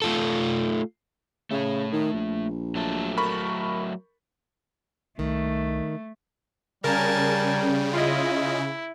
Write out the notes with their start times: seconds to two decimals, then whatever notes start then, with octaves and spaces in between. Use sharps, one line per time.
0.02 A3 F4 A4
1.51 C#3 A3 C#5
1.92 D#3
2.13 A#1
2.75 F#3 A3 A4
3.17 A#4 B5 C#6
5.19 C2 D#3 A3
6.84 C#3 G3 A#4 G#5 A5
7.93 E4 F4 D#5